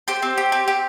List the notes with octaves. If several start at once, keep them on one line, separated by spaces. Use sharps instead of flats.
G4 C5
C4
G4
C4
G4